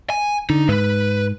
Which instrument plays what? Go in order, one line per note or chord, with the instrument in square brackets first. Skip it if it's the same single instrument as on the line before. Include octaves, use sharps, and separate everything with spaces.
[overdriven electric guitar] G#5
[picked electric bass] D3 [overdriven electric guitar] D#4
[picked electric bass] G#2 [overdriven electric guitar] B4